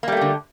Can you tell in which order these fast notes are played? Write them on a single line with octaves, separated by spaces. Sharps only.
A#3 G3 A3 G4 D3